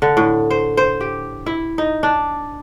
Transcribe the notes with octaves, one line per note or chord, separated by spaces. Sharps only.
D3
A2
C5
C5
G4
E4
D#4
D4